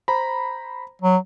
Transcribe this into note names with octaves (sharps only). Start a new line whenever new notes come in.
C5 A#5 B5
F#3